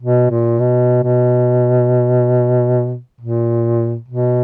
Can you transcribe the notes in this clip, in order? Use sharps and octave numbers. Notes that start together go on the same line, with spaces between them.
B2
A#2
B2
B2
A#2
B2